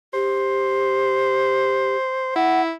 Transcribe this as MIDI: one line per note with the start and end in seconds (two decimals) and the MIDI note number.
0.14 1.97 67
0.14 2.31 72
2.36 2.72 64
2.36 2.62 78